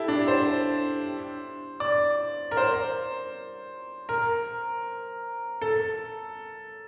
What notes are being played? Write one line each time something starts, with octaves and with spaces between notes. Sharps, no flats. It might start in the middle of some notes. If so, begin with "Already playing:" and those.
Already playing: E4 G4 A4
D4
C5
D5
A#4
C5
A#4
A4